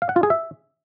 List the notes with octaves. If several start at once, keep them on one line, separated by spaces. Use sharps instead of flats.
F5
F#5
F4
G#4
E5